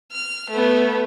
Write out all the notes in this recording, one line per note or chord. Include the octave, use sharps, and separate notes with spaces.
F6
A3 B3